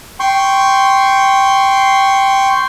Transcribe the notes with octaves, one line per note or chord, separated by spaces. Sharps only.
G5 C6 C#6